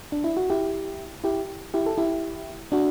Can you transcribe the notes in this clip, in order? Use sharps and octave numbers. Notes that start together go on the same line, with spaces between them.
D4
E4
F#4
E4 G4
E4 G4
E4 G4
A4
E4 G4
D4 F#4